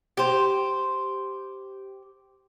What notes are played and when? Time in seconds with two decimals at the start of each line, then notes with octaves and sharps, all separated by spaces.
0.17 G4 C5